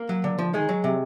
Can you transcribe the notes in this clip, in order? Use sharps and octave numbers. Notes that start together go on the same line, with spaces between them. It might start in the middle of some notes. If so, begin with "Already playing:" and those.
Already playing: A#3 A#4
F#3
D3
F3
D#3 G#3 G#4
F#3
C3